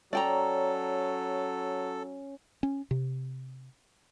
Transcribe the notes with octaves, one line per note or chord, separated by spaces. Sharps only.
F#3 C#4 A4 D5 G5 A#5
C#4
C3